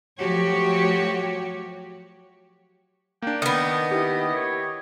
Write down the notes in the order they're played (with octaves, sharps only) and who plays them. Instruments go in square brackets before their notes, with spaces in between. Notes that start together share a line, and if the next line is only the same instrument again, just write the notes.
[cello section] F3 F#3 A3 F#4 G4 C#5
[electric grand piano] A#3 D4 [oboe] G5
[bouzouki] D#3 B3 [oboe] D#5
[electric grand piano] E4 G4
[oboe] C#5